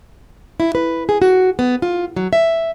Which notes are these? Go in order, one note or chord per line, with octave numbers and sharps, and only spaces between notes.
E4
B4
G#4
F#4
B3
F4
F#3
E5